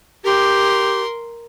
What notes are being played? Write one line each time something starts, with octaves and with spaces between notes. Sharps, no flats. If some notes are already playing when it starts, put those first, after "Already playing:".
G4 A#4 C6